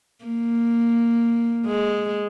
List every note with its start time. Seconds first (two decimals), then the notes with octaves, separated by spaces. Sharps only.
0.24 A#3
1.66 G#3